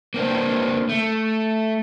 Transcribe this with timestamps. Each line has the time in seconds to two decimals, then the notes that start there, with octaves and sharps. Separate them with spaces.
0.14 A#3 C4 D4
0.89 A3